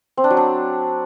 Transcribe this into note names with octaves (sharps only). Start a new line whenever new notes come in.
C4
D4
F#3
D4